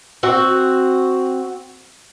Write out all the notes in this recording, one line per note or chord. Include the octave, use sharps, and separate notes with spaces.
C4 F#4